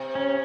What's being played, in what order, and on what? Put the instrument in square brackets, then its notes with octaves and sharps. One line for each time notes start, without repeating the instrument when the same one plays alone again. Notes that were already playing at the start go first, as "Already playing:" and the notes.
Already playing: [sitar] C3
[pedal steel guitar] C#4